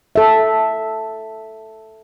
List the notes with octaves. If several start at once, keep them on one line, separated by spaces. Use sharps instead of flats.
A4 E5